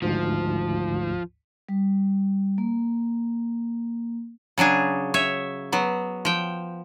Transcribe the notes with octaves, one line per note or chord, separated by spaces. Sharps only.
G#1 D2 G#2 F3
G3
A#3
C#3 F#3 D4 G#4
C#5 E5
F#3 B3
F3 G5